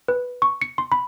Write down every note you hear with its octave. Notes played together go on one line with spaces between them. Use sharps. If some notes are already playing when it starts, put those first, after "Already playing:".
B4
C#6
C#7
C6
B5